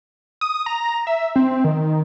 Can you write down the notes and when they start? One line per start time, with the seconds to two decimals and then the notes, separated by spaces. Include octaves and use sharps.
0.41 D#6
0.66 A#5
1.07 E5
1.36 C4
1.64 D#3